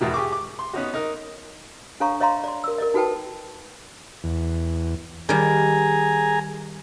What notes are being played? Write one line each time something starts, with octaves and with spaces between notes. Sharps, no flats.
E2 G#2 B2 D#3
G4 G#4 C#6 D6
D6
C6
B3 C#4 D#4 F#4
D#4 A#4
D4 A4 C#5 F5 A#5 C#6
C#5 D#5 F5 A#5 C6
D5 C6
A#4 E6
A#4 D5 D#5
D#4 F#4 A4 B4 G5 A5
E2
D#3 G3 G#4 G#5 A#5